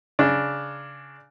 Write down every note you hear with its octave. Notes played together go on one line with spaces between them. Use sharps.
C#3 D4